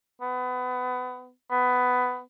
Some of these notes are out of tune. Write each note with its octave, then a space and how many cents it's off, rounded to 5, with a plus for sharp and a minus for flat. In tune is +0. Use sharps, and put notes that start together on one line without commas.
B3 +25
B3 +15